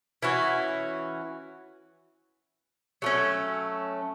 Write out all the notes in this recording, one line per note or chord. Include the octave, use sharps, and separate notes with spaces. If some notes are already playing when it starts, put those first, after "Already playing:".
E3 C#4 F#4
F#3 A3 C#4